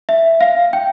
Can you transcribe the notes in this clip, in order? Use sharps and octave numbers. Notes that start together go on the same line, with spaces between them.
E5
F5
G5